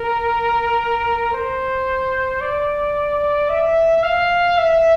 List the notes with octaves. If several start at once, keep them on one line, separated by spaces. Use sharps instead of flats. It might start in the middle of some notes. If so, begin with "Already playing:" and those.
Already playing: A#4
C5
D5
E5
F5
E5